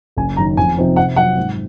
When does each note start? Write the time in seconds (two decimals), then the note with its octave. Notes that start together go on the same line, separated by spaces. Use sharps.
0.17 F#1 G#5
0.36 F#2 D#3 A#5
0.57 F2 G#5
0.77 C3 F3 C4 D#4
0.96 C3 F#5
1.16 F#3 C4 F4 F#5
1.37 G#2